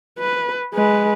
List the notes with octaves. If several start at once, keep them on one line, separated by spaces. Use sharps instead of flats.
B4
G#3 B4